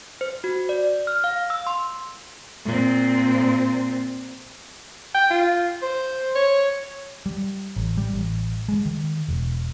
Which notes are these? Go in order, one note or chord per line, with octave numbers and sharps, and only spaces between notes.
C5
F#4
D5
F6
F5
E6
C6
A#2 C4
G5
F4
C5
C#5
G3
A1
G3
A1
G#3
D#3
E1